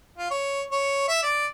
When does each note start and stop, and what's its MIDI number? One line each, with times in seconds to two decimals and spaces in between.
0.18 0.30 65
0.31 0.63 73
0.71 1.08 73
1.08 1.22 76
1.23 1.46 74